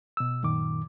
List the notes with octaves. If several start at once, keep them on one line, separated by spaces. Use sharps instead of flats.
B2 E6
F#2 A#2 D#3 D6